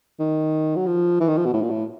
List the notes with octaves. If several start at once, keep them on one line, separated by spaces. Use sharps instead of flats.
D#3
F#3
F3
E3
D#3
F3
B2
A2
A#2
A2